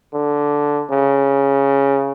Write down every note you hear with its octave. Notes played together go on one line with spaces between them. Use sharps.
D3
C#3